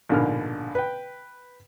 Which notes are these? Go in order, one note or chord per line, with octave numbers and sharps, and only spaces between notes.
A#1 G#2 B2 D3 A#3 F6
B4 G5